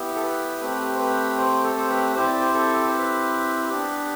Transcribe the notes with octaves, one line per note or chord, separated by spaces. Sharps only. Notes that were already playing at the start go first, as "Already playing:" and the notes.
Already playing: B3 E4 G4
A4
B4
A3 C4 G4 B4
C5
B4
C5
A4
C5
B4
C4 E4 G4 C5
D5
C5
A4
C5
B4
B3 D4 G4